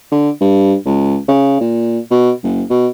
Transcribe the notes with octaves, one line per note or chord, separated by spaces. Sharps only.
D3
G2
C#2
C#3
A#2
B2
F#1
B2